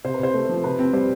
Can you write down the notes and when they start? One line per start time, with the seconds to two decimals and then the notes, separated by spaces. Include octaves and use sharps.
0.04 C3 C5
0.14 B4
0.19 C3 C5
0.34 A3
0.49 F3
0.64 C3 B4
0.79 C4
0.93 G3 C5